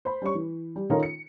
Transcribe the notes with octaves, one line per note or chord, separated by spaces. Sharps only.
C5 B5
G3 C#4 C#6
E3
G3
D#3 C#4 D#4 F4 A4 A#4
C#7